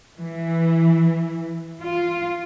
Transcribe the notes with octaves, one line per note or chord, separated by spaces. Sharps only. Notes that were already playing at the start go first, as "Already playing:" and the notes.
E3
F4